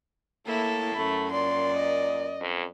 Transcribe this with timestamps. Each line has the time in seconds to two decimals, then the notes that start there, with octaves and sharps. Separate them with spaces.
0.47 A2 A#3 E4 A4
0.96 F#2 A3 B5
1.32 A#2 D5 C6
1.77 D#5
2.41 F2